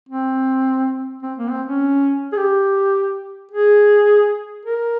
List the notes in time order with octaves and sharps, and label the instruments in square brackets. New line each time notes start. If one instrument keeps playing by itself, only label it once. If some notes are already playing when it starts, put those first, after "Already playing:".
[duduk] C4
C4
A#3
C4
C#4
G#4
G4
G#4
A#4